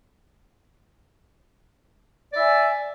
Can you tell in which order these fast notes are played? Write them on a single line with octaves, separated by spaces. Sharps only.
D5 E5 G#5